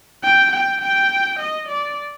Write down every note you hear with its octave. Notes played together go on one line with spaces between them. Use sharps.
G5
G5
G5
D#5
D5